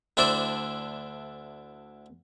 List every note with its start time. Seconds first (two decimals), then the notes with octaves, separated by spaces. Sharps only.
0.17 D2 D4 E4 C5 A5 D6